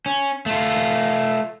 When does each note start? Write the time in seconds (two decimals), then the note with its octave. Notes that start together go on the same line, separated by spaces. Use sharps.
0.06 C#4
0.46 A3 F4